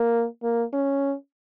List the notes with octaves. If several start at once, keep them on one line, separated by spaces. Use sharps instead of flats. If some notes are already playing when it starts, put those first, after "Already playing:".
Already playing: A#3
A#3
C#4